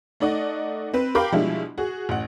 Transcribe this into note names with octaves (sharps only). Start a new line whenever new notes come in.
A3 D#4 D5 D#5 F#5
C4 B4
G4 A#4 F5 G5 B5 D6
B2 F3 G3 G#3 D4 E4
F#4 G#4
A1 F#5